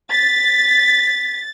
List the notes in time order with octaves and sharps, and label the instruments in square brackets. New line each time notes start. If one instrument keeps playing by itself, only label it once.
[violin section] A6 [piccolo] B6